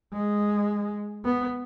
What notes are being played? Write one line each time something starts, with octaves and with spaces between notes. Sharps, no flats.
G#3
B3